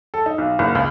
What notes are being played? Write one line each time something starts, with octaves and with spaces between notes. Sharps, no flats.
A4
D#4
B1
F#1
C#2